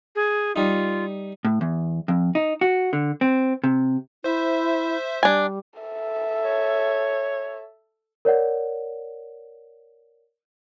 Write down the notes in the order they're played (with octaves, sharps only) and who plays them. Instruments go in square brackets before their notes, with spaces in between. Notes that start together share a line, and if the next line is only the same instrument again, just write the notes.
[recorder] G#4
[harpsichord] G3 D#4 [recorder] F4
[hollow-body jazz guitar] A2
E2
F2
D#4
F#4
D3
C4
C3
[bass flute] E4 [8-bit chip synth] C5 E5
[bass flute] G3 [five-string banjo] D4 G#5
[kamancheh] A4 E5
[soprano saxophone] C#5
[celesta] A#4 C#5 D5 F#5